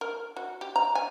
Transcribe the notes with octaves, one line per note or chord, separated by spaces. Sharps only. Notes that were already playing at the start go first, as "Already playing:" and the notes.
A#4
F#4
G4
A#5
G#5